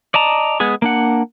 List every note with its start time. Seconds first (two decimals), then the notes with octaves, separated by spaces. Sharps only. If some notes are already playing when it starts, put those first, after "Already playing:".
0.14 D5 D#5 A5 A#5
0.60 G#3 B3 G#4
0.82 A#3 D4 F#5